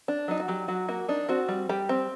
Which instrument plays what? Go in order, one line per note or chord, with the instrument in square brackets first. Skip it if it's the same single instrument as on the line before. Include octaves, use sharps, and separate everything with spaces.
[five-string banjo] D4
F#3 D#4
F#4
F#3 G4
F#3 F#4
A#3 F#4
D4 D#4
C4 F#4
G3
G3 G4
C4